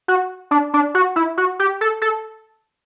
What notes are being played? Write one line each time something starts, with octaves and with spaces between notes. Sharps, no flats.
F#4
D4
D4
F#4
E4
F#4
G4
A4
A4